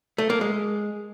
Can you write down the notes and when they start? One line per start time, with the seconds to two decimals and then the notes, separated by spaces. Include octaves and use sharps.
0.18 A3
0.30 A#3
0.41 G#3